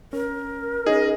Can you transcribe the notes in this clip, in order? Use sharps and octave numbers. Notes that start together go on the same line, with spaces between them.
C#4 A#4
C#4 D#4 G#4 D#5